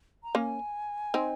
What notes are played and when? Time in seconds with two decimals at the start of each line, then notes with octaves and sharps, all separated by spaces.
0.24 A#5
0.35 A#3 C#4 G#5
1.14 C4 D#4